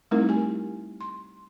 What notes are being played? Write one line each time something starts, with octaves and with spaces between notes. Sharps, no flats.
G3 A3 C4 D#4 E4 A#4
G4 G#5
C6